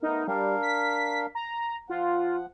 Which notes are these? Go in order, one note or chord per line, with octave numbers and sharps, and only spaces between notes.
A3 B3 D#4 A#4
G3 D4 A#4 F5
B6
A#5
F3 F4 F#5